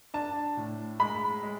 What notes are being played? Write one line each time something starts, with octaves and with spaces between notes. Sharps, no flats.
D4 A5
A2
G#3 B5
G#3